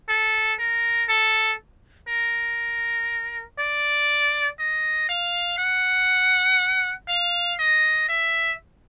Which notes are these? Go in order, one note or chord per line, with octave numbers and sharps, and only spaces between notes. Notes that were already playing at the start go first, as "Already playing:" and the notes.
A4
A#4
A4
A#4
D5
D#5
F5
F#5
F5
D#5
E5